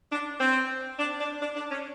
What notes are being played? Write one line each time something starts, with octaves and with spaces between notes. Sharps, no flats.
D4
C4
D4
D4
D4
D4
C#4